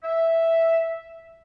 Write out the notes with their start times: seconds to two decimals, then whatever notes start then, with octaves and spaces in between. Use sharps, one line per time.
0.04 E5